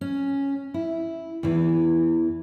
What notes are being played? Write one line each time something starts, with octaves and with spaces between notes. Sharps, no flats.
C#4
E4
E2 E3